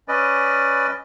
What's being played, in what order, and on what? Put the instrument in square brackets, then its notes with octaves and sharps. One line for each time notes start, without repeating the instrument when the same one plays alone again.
[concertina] C#4 B4 D5 D#5